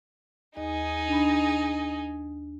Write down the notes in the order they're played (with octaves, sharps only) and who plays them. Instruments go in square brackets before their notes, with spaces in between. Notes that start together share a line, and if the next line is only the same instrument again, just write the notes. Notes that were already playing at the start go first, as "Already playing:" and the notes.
[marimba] D#2 D#5 [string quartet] D#4 G#4
[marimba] D4 B5